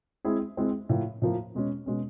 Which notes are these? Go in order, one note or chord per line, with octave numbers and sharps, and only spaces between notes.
G#3 C4 E4 G#4
G#3 C4 E4 G#4
A2 F3 A#3
A2 F3 A#3
B2 G#3 C#4
B2 G#3 C#4